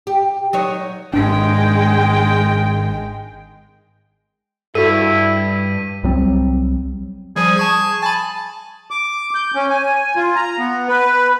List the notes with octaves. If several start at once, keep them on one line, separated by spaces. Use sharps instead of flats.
G4
F#3 D#4 C#5
G#1 G#2 G#3 D4 G5
G2 E4 F#4 A4 B6 D#7
C2 F#3 G3 C4
F3 G3 G#4
G#4 A5 C#6 G#6
G#5 A5 B5
D6
G6
C#4
G#5
F4
A#5
B3
B4